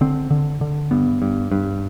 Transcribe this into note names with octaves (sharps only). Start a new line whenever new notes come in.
D3 C4
D3
D3
G2 B3
G2
G2